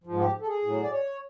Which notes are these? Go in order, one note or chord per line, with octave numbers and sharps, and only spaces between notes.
G#2 F3
G4
A4
G#4
A2 F#3
D5
C#5